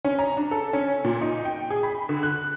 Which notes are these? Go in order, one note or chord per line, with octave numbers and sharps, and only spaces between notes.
C#4
A#5
D4
A4
C#4
A#2
D#4
G5
G#4
B5
D3
F#6